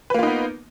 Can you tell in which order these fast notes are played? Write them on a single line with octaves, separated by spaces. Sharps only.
B4 A#3 F4 D#4 B3